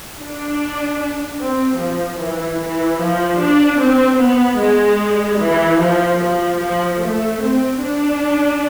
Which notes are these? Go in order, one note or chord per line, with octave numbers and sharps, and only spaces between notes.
D4
C4
F3
E3
E3
F3
D4
C4
B3
G#3
E3
F3
F3
F3
A3
C4
D4